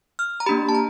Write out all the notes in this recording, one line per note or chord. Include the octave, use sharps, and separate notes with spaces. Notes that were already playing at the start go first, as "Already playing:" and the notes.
F6
A#5
A#3 D4 G4 B5
A5
A#5